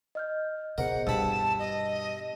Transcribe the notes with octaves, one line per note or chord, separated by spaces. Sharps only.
D#5 F6 G6
B2 G#4 A#4 C5 D#5 F#5
G2 B2 E3 A5 B5 E6
D#5